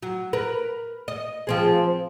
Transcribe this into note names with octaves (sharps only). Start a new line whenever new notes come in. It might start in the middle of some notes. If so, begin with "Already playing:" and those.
F#3
A#4 B4
D#5
F3 C4 G#4